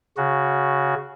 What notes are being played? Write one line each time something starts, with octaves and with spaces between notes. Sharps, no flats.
C#3 F#4